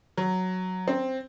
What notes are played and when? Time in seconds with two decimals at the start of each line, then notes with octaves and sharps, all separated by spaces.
0.17 F#3
0.88 C4